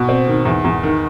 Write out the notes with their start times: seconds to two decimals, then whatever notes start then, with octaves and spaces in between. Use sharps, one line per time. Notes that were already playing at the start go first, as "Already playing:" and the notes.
Already playing: B2
0.09 C4
0.27 D#3
0.45 E2
0.64 E2
0.83 D#3